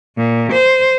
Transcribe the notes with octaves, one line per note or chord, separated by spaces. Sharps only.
A#2
C5